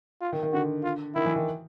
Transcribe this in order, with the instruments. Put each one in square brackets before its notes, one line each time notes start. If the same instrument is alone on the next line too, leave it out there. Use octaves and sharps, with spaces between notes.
[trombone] F4
[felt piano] D#3
D#3
[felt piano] D3 [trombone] F#4
[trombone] F4
[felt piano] D#3 [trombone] E4
[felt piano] E3
D#3